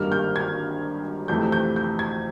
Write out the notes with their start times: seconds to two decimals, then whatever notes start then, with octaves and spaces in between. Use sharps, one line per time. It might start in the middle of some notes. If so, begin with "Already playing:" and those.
Already playing: G#1 G2 D#3 G3 A#3 F6
0.12 G6
0.36 G#6
1.28 F2 C3 E3 A3 G6
1.52 G6
1.76 G6
1.99 G#6